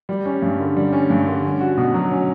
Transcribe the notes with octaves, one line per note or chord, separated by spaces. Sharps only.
G3
C#4
G2
D3
G3
C#4
G2
D3
C#4
F#4
B2
F#3
C#4